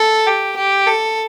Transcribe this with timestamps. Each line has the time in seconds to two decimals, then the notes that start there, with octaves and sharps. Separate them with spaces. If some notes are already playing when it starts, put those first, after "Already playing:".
Already playing: A4
0.27 G4
0.56 G4
0.86 A4